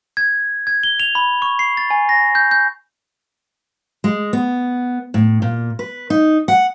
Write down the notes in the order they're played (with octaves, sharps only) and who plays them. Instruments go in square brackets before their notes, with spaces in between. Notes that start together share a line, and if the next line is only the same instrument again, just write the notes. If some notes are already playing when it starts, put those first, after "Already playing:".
[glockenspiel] G#6
G#6
G7
F7
B5
C#6
C7
A6
G#5
A#6
G6
G6
[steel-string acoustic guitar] G#3
B3
A2
A#2
B4
D#4
F#5